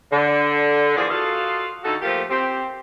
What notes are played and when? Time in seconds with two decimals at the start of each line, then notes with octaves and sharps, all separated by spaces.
0.11 D3
0.97 E3 F3 A#3 F4 G#4 D5
1.10 F4 F#4 A4 D#5 F5
1.84 D3 D#4 F#4 A4
2.02 F3 A3 A#3 F4 G4
2.30 C4 G4